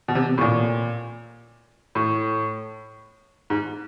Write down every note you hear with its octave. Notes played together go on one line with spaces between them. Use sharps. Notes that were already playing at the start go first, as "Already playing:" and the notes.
B2
C3
A2
A#2
A2
G#2